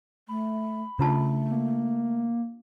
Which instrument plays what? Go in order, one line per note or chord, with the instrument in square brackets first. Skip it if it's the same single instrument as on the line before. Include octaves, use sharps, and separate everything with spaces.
[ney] A3 [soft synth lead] B5
[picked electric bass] C#3 [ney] A3 [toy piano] D4 F4 A5
[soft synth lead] A#3